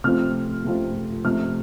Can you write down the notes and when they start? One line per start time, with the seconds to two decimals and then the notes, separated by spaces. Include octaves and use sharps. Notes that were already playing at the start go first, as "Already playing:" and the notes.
0.04 C3 F3 A3 C4 F4 F6
0.65 C3 F3 A3 C4 F4
1.24 C3 F3 A3 F6